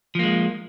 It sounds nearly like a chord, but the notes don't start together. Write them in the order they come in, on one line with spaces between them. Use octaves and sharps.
F3 A#3 G#3